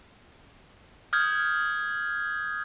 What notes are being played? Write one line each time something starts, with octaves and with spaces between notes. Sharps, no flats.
D#6 F6 G6 G#6